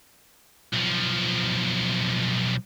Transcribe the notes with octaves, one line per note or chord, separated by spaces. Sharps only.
B1 F3